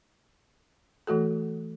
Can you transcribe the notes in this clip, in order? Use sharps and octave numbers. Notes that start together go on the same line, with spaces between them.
E3 A3 F#4 A4